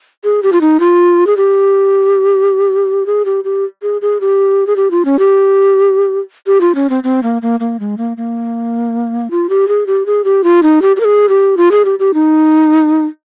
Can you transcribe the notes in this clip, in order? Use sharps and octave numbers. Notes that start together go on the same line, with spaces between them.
G#4
G4
F4
D#4
F4
G#4
G4
G#4
G4
G4
G#4
G#4
G4
G#4
G4
F4
C#4
G4
G4
F4
C#4
C4
C4
A#3
A#3
A#3
G#3
A#3
A#3
F4
G4
G#4
G4
G#4
G4
F4
D#4
G4
G4
A#4
G#4
G4
F4
G#4
G4
G4
D#4